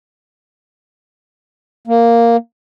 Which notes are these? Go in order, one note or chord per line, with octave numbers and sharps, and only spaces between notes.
A#3